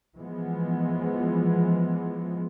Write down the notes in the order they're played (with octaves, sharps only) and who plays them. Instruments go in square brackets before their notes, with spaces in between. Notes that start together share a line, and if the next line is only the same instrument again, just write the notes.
[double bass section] E3 F3 G#3 B3